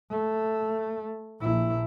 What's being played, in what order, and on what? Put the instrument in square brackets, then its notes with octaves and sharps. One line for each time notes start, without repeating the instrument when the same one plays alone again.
[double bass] A3
A#1 E4